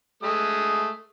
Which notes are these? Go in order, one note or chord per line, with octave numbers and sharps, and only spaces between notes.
G#3 A3 D#6